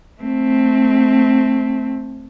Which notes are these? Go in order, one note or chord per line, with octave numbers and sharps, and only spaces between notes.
A3 C4